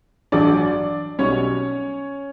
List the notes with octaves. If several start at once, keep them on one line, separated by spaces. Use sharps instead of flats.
A1 G2 F#3 D4 D5
B1 B2 G3 C#4 C#5